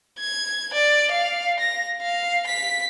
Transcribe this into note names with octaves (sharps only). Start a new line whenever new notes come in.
G#6
D5
F5
A#6
F5
B6